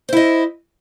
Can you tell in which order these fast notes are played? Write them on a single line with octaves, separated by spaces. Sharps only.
C5 E4 D#5